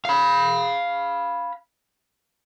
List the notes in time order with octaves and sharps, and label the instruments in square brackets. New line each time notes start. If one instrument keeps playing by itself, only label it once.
[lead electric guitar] F5 B5